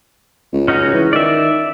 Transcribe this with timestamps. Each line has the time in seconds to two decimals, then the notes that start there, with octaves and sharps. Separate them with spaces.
0.53 C#2
0.68 C#4 D#4 F#4
0.93 E3
1.13 D#3 D5 E5